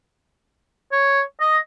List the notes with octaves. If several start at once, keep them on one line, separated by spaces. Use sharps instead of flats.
C#5
D#5